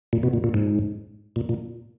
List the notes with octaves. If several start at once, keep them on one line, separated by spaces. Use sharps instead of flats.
A#2
B2
A#2
A#2
G#2
A#2
A#2